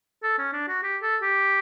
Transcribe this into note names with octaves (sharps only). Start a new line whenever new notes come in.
A4
C#4
D4
F#4
G4
A4
G4